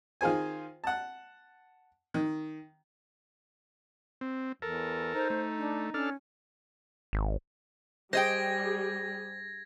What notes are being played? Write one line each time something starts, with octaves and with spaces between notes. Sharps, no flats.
D#3 F4 G#4 C5 G#5
F#5 A5
D#3
C4
E2 A4 A#4
D#4 C5
A3
D4
C#4 D4 A4 F6
G#1
G3 G4 G#4 C5 D#5 G5 G#6 A#6